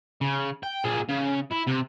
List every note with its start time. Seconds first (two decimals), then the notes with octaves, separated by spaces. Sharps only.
0.21 C#3
0.63 G5
0.84 A#2 G#4
1.09 C#3
1.52 E4
1.68 C3